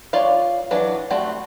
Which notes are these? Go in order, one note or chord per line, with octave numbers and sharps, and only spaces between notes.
F4 C#5 D5 F5
E3 F#3 D4
G3 A3 C4 F#4